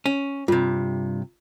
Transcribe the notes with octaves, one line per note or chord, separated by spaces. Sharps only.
C#4
G2 C3 F4